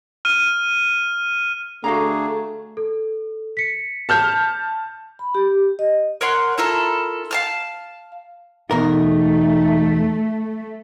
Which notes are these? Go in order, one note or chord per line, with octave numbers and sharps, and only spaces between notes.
F6 D#7
D3 A3 D4 F#4 G#4 F5 A#5
A4
B6 C#7
A5 F6 G6
B5
G4
D#5
A#4 C#5 F#5 C6
E4 F4 A4 A#4
F5 A5 F6
E2 B2 A3 D#4 A#4